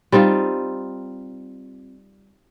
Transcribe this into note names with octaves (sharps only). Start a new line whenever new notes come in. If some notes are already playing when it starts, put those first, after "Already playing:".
G3 C4 D#4 F4